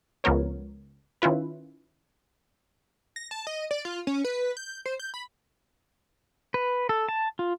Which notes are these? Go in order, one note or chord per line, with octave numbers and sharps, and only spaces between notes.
C#2 F3 B3 A#4 C#5
D#3 C#4 E4 F4 B4
A#6
A5
D#5
D5
F4
C#4
B4
G6
C5
G6
B5
B4
A4
A5
F4